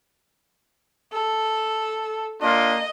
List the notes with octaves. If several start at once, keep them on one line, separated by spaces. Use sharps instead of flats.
A4
A#3 D4 F4 D#5